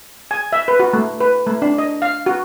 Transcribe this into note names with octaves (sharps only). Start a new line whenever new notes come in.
G#5
E5
B4
F#4
A3
B4
A3
D4
D#5
F5
F#4